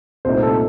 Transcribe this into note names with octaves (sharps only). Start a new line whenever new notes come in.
C2 A#2 A3 D#4 C5
A4